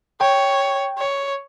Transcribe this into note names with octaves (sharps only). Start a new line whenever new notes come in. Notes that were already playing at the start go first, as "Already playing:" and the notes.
C#5 G5
C#5